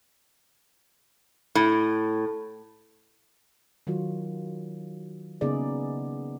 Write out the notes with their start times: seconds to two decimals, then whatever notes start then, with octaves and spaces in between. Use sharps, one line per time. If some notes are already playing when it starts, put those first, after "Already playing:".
1.55 A2
3.87 D#3 F#3 F4 F#4
5.41 C#3 A#3 B3 D#4 G#4 D5